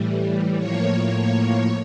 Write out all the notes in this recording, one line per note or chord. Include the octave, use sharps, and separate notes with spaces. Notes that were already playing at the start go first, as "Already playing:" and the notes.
Already playing: A2 E3 G3
A2 F3 A#3 C#5